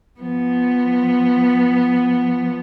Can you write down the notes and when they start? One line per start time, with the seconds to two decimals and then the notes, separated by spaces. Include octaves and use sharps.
0.20 F3 B3